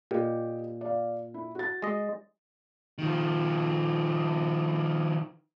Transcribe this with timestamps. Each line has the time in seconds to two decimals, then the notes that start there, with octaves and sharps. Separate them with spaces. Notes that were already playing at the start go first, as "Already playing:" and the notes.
0.11 A#2 G4 D#5
0.81 D5 F5
1.34 E4
1.55 F#4 A6
1.82 G#3 D#5
2.98 D#3 F3